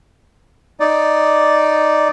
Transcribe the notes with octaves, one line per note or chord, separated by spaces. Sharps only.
D#4 D5